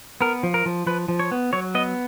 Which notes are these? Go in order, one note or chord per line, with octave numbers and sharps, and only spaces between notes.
B3 A#4
F3
A#4
F3
F3 B4
F3
C#5
B3
F#3 C#5
B3 D#5